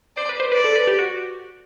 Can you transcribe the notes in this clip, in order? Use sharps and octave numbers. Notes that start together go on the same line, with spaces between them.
C5 D5
B4
C5
B4 D5
A4
B4
G4
F#4